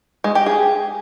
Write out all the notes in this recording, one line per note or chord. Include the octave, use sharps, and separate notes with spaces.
G#3
G4
G#4